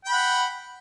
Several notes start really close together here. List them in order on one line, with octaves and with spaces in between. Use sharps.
G5 B5 F#5